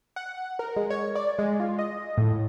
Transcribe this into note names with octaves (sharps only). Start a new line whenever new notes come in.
F#5
A#4
G#3
C#5
D5
G#3
F4
D#5
A2